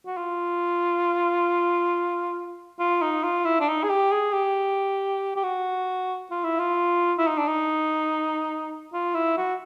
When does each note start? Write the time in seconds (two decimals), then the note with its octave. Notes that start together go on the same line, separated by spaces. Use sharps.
0.06 F#4
0.17 F4
2.80 F4
3.02 D#4
3.23 F4
3.45 E4
3.60 D4
3.68 D#4
3.83 G#4
3.89 G4
4.12 G#4
4.33 G4
5.36 G4
5.43 F#4
6.31 F4
6.44 E4
6.59 F4
7.18 E4
7.27 D#4
7.37 D4
7.47 D#4
8.93 F4
9.14 E4
9.37 F#4